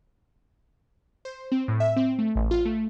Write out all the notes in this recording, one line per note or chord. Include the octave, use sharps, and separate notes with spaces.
C5
C4
A2
E5
C4
A3
A1
F4
A3